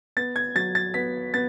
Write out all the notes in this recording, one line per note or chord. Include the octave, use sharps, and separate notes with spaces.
B3 A6
G#6
F#3 A6
A6
B3 B6
B3 A6